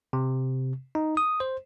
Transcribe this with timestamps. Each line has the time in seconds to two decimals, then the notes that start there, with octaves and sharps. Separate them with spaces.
0.13 C3
0.95 D#4
1.17 D#6
1.40 C5